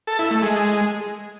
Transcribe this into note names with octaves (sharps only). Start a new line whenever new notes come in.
A4
E4
A3
G#3